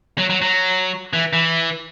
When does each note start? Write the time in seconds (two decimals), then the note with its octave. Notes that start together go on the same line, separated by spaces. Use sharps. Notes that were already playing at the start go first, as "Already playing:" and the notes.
0.18 F#3
0.30 F#3
0.42 F#3
1.13 E3
1.33 E3